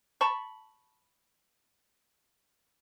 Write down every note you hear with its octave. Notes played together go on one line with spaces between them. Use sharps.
A5 B5 C#6